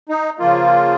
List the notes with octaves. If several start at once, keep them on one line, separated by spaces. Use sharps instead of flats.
D#4
C#3 F3 A#3 F4